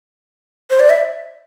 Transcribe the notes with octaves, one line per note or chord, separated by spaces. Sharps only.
C5
D5
E5